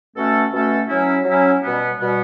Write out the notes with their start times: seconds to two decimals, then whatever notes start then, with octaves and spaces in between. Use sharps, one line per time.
0.15 B2 A3 C#4 F#4 A4
0.52 B2 A3 C#4 F#4 A4
0.89 F#3 C#4 E4
1.25 F#3 C#4 E4
1.63 B2 G3 B3
1.99 B2 G3 B3